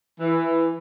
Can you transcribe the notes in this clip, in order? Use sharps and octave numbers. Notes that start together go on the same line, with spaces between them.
E3